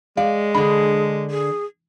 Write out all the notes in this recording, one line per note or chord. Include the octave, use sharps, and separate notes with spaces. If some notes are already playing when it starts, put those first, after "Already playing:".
G#3 D5 F5
D3 D4 G#4 B5
G#4